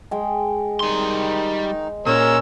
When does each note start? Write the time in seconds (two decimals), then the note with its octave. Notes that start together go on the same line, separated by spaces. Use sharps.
0.11 G#3 G5
0.80 D#3 G3 D#4 C6
2.06 A#2 C#4 A#4 C#5 E6